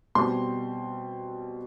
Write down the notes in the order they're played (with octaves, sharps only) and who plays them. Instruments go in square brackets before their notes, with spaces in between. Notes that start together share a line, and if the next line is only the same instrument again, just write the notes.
[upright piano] B2 G3 C4 C6